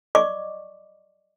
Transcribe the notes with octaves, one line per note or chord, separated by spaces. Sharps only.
D5 D#5 C#6 D6